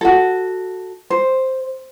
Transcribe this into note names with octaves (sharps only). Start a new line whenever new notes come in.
F#4 A4
C5